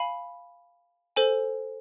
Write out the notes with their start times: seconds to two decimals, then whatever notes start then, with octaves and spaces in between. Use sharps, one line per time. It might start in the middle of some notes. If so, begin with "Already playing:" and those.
Already playing: F5 G#5 B5
1.16 A4 C5 G#5